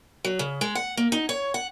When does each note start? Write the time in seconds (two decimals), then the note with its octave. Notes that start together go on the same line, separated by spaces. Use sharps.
0.25 F#3
0.39 C#3
0.61 G#3
0.75 F#5
0.97 A#3
1.12 D#4
1.29 C#5
1.54 F#5